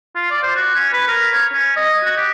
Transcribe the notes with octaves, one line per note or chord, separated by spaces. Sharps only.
F4
D5
C5
F#4
C#4
B4
A#4
C#5
C#4
D#5
F#4
G4